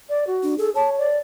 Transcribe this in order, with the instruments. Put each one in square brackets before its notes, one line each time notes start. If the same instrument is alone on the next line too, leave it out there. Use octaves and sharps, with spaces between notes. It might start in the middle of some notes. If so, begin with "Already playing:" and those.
[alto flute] D5
F#4
[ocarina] D4
[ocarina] G#4 [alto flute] A4
[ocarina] C#5 [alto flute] A5
[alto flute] D5